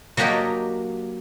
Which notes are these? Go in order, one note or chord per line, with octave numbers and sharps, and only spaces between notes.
F#3 A#3 D4 G4 C#5 D#5